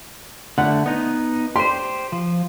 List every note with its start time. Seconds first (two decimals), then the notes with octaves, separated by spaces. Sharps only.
0.58 D3 A3 F#5
0.86 B3 D#4
1.56 G4 C5 C6
2.12 F3